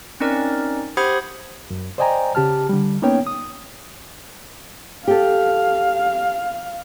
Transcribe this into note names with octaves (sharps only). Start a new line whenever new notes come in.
C4 C#4 D#4 A#4 D5
G4 C5 F#5 B5 D#6 G#6
F#2
C5 D5 D#5 G5 G#5 A#5
C#3 G4 A5 F6
D3 G3
A#3 B3 C#4 D#4 C#5 G5
D#6
G4 A4 F5